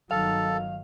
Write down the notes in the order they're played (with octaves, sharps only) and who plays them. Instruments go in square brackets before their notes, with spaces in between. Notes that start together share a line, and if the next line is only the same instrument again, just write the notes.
[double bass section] G1 D#3 F#3 [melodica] A4 [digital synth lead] F5